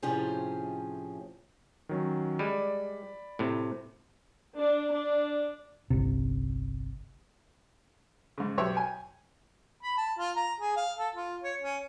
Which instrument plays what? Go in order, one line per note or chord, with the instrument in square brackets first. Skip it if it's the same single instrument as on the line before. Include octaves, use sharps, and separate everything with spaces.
[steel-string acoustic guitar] A2 C3 F3 C#4 G4 G#4
[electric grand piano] D#3 F#3 C#4
[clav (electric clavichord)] G3 G#3 [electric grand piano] D5 B5
[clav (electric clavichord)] A2 C3
[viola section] D4
D4
[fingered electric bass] G1 C2 C3
[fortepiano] G#2 C#3
B1 G4 C#5 E5
G5 G#5
[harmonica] B5
A5
F4
A#5
G#4
F5
A4
F4
C#5
C#4